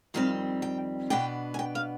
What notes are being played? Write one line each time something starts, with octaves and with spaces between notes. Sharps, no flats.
F2 D#3 G3 C4 F5
G5
B2 B3 D4 G5
G#5
G5
F5